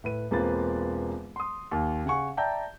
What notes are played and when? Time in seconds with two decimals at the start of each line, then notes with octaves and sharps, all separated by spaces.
0.04 A2 B4 D#7
0.31 E1 A#3 C4 F4 B4 A6
1.36 C6 D#6
1.71 D#2
2.06 C#3 F#5 G#5 C#6
2.37 D5 E5 G5 A5 A#5 G6